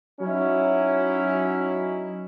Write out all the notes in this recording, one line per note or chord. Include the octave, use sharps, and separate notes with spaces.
F#3 C#4 D#4 E4